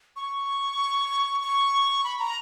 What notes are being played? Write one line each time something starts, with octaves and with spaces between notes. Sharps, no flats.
C#6
C#6
B5
A#5